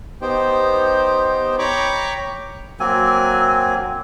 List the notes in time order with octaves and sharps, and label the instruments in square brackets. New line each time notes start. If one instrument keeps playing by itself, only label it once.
[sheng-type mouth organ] B3 D#4 G4 C5 G5
C#5 G5 A#5 B5 C#6 D6
[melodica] F#3 A#3 C4 G#5